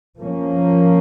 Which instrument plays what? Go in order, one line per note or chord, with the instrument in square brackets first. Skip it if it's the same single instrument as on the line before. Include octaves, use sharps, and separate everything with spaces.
[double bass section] F3 A#3 C#4